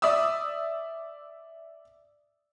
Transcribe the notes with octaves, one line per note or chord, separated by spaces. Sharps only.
D5 E5 D#6 E6